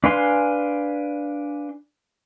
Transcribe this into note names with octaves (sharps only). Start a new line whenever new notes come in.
D4 B4 F5 G#5 C6